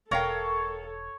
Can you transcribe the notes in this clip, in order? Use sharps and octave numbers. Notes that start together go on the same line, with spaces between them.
E1 A4 A#4 C#5 F5 G5